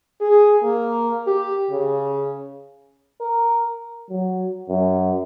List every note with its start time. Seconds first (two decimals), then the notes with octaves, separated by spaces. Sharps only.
0.21 G#4
0.63 A#3
1.27 G4
1.71 C#3
3.21 A#4
4.11 F#3
4.70 F#2